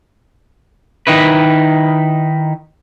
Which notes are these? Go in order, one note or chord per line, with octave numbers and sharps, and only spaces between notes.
D#3 D#4 E4 B4